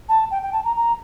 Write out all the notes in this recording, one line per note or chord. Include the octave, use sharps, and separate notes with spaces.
A5
G5
G5
A5
A#5
A#5